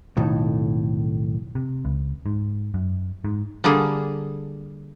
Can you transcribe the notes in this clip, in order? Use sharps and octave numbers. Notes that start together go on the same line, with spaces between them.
B1 F2 A2 D#3
C3
C#2
G#2
F#2
G#2
D3 G3 A#3 G#4 A4